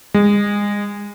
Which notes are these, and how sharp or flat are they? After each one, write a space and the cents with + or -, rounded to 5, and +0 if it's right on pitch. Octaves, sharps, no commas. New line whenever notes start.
G#3 -25